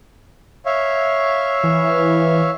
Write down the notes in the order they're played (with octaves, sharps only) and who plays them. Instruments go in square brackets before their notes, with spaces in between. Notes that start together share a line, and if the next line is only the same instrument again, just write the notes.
[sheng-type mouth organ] C#5 E5 F5
[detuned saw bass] E3